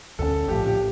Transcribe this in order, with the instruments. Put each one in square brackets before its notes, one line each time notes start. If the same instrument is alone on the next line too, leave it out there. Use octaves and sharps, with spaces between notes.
[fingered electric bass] D2 D3 F3 C#4 [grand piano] A4
[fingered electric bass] A#1 A2 F3 [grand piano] G4
[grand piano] G4